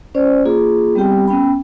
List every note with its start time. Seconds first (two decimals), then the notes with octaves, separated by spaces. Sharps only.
0.15 C#4 C5 D5
0.46 A#3 F4 G#4
0.95 G3 B3 C4 G4 G5
1.28 B3 C#4 G5 B5